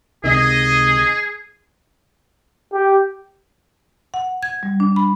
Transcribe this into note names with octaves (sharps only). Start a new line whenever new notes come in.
C#2 C3 D#3 G#4 D#5
G4
F#5
G#6
G3
D4
B5